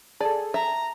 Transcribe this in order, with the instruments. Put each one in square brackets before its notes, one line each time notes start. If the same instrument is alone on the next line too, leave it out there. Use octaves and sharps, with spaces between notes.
[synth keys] G#4 A4 [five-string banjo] D5 [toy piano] A5
[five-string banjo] E5 [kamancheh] A#5